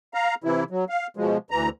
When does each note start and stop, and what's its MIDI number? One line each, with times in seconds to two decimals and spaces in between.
0.14 0.35 77
0.14 0.35 82
0.44 0.64 48
0.44 0.64 52
0.44 0.64 64
0.71 0.85 54
0.89 1.07 77
1.17 1.38 47
1.17 1.38 53
1.17 1.38 56
1.51 1.69 38
1.51 1.69 52
1.51 1.69 82